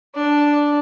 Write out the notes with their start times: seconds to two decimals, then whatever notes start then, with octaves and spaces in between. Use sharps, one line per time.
0.15 D4